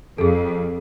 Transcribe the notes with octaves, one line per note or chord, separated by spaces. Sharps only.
F2 G#4 A4